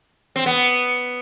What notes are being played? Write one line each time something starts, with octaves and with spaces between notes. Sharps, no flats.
C4
B3